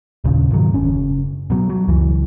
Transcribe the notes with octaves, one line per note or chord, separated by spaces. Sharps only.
D#2 A#2 C#3
G#2 B2 D#3 F#3
F#1 C#4
B2 F#3
F#3
C#2 F#2 E3